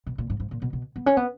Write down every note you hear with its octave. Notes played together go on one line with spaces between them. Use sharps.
B2
A#2
G#2
G#2
A#2
B2
B2
B3
C#4
B3